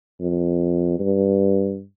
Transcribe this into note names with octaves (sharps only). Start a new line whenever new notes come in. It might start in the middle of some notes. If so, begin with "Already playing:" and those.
F2
G2